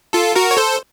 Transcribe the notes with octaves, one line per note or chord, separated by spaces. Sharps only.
F4 A4
F#4 A#4
C#5
A4 C5